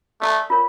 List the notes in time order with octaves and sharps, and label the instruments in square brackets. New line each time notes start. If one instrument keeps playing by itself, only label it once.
[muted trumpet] A3 [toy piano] A4 D5 F5 A5
[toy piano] F4 A#4 C#5 F5